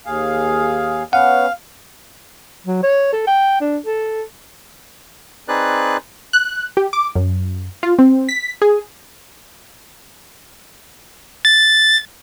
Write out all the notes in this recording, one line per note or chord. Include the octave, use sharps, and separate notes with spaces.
D#2 G#4 F5
B3 C#4 F5 F#5
F#3
C#5
A4
G5
D4
A4
C4 D#4 G#4 B4 D5 F#6
F#6
G4
D6
F#2
F4
C4
B6
G#4
A6